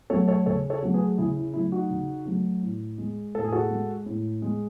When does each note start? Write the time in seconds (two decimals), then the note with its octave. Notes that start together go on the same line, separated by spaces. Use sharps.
0.10 F#3 A3 A4 C#5
0.28 A4 C#5
0.46 C#3 A4 C#5
0.70 A4 C#5
0.82 F#3 A3
0.94 G#4 B4
1.18 C#3 E4 G#4
1.36 E4
1.53 F#3 A3 E4
1.72 D#4 F#4
1.90 C#3
2.26 F#3 A3
2.62 A2
2.98 G#3
3.35 A2 A4
3.44 G#4
3.52 F#4 A4
3.70 G#3
4.06 A2
4.42 G#3